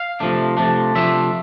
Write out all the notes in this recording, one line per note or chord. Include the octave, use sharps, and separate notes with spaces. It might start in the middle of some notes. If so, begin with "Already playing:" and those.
Already playing: F5
C3 F3 A3 D4
C3 F3 A3 D4
C3 F3 A3 D4 E5